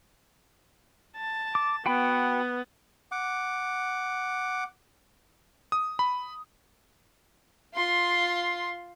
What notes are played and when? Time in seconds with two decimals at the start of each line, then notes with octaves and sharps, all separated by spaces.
1.17 A5
1.55 D6
1.86 B3 F#4 G5 B5
3.12 F#5 D6
5.72 D#6
5.99 B5
7.74 F4 C6